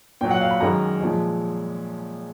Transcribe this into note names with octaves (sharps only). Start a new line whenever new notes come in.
A#2 F#3 G5
F#5
F5
B5
F#2 D#3 G#3 A#5
A#2 F3 G#3